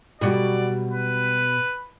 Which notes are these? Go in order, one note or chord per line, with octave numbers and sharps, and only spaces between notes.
B2 F#3 G3 F#4 D5
B4